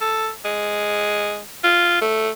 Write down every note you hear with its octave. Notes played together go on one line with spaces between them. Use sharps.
A4
G#3
F4
A3